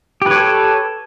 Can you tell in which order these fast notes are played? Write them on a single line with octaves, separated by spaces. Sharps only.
G4 B4 C#5 A4